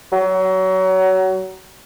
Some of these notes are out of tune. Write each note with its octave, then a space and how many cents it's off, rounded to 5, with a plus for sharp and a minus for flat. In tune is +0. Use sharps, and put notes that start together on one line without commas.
F#3 +25